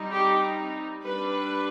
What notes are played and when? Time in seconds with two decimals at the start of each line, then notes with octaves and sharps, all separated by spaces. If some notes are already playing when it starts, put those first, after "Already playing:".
Already playing: G3 C4 D#4
0.12 G4
1.04 G3 D4 B4